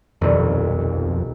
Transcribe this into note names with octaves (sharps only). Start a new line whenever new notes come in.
D#1 B1 F2